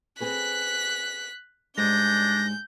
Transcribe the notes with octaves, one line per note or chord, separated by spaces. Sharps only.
C4 G#4 B4 F#6 B6
G#2 G3 G#3 D4 G6 A#6